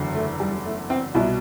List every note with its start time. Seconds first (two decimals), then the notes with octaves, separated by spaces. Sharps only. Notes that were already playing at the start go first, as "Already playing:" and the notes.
Already playing: F#1 E2 D3 F#3
0.15 A3
0.40 G3
0.65 A3
0.90 C4
1.14 C2 B2 G3 E4